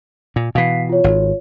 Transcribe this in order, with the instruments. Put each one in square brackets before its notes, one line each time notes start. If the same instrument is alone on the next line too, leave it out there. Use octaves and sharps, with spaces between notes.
[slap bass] A#2
[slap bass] B2 E3 [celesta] F5 B6 C7
[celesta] F4 C#5
[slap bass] G#1